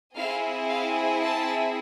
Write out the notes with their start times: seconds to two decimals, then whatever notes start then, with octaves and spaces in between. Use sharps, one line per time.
0.16 C4 E4 G#4 F5
0.68 F5
1.21 A5